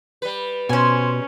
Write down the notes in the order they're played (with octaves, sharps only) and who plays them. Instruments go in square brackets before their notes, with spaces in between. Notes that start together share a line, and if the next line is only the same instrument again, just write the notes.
[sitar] G3 B4
[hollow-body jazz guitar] B2 [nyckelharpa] C#4 [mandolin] C5 G#5